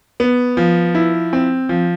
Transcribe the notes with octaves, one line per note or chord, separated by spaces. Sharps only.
B3
F3
E4
C4
F3